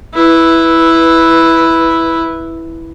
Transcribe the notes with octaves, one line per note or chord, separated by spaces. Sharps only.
E4 B4